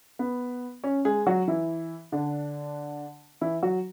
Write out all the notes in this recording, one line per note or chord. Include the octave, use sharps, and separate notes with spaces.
B3
C#4
G#3 G#4
F#3 F#4
E3 E4
D3 D4
E3 E4
F#3 F#4